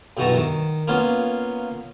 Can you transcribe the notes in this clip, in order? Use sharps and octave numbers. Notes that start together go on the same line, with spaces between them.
B1 G2 E3 F#4 A5 A#5
D#3
A#3 B3 C#4 F4